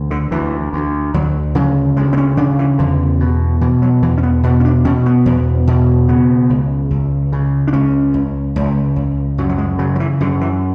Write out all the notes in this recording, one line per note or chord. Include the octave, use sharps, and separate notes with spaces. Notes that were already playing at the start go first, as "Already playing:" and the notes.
Already playing: D2
D3
D2 E3
D2
D2 F#3
C#3 F#3
D2 G#3
B3
C#4
C#3 D4
E3
E2 D3
B2
B2 E3
F#3
E2 E3
C#4
B3
B2 B3
C#4
D4
B2 C#4
B3
E2
B2
C#3 B3
C#2
C#2
C#3
D4
C#2 C#4
C#2
C#2
C#2
F#2 F#3
F#3
G#3
C#3 F#3
F#3
E3
F#2 D3
E3